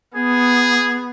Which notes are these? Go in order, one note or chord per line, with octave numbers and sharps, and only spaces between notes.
B3 G#4